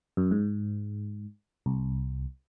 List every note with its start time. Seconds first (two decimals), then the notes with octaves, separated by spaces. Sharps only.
0.17 F#2
0.31 G#2
1.66 C2